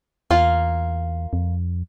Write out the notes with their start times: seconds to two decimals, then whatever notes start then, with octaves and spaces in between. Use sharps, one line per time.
0.31 E2 A#3 F4
1.33 F2